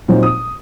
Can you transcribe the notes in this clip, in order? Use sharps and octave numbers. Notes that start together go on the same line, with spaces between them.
A#2 F#3 C4 D#4
D#6